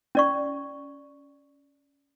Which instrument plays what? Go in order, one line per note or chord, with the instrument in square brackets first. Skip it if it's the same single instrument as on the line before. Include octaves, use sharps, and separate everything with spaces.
[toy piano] C#4 D5 C#6